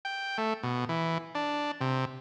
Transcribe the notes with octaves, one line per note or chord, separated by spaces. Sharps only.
G5
A3
B2
E3
D4
C3